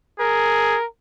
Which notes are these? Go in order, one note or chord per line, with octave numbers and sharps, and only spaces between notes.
G#4 A#4